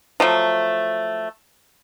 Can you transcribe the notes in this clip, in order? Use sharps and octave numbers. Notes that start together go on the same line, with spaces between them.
F3 F#3 A3